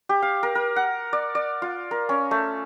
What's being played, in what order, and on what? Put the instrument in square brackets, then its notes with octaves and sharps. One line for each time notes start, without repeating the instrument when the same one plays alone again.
[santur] G4
F5
A#4
A#4
F#5
D5
D5
F4
A#4
C#4
A3